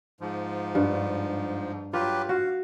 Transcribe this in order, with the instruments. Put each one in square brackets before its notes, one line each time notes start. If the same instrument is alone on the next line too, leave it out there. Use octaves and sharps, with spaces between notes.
[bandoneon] G#2 F3
[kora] G2
[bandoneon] F#3 G4 B4 [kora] F4
[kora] F#4 [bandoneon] F5